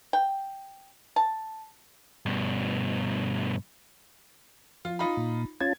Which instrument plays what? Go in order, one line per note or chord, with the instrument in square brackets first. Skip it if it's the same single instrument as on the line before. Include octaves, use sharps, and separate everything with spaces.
[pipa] G5
A5
[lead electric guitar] G2 B2
[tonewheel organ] F3 [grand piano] F4
[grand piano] D#4 F4 B5
[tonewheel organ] A#2
[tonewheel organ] C#4 F4 A5 [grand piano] G#6